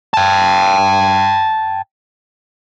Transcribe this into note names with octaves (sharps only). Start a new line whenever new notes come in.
G5 A5